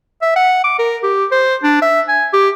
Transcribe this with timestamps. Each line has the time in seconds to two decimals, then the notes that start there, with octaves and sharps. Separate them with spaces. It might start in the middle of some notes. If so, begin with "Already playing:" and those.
0.22 E5
0.36 F#5
0.64 D6
0.79 A#4
1.03 G4
1.32 C5
1.63 D4
1.82 E5
2.09 G#5
2.33 G4